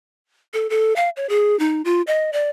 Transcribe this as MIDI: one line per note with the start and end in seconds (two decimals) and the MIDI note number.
0.54 0.69 69
0.70 0.95 69
0.96 1.09 77
1.17 1.29 73
1.29 1.58 68
1.59 1.82 63
1.85 2.02 65
2.07 2.31 75
2.33 2.50 74